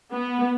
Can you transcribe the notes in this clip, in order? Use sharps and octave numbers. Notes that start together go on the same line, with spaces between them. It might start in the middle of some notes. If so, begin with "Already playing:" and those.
B3